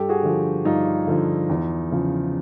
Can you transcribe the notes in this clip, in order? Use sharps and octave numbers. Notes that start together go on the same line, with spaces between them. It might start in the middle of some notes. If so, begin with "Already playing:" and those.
Already playing: G2 G4 A4
F#4 G#4
D3 F3
G2 D#4 F4
D3 F3
E2
C#3 F3